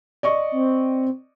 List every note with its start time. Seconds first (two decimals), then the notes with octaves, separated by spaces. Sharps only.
0.23 D5 D#5 C#6
0.52 C4